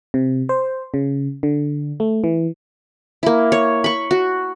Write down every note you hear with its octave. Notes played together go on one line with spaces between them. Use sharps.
C3
C5
C#3
D3
A3
E3
A#3 E4
C#5
B5 C#6
F#4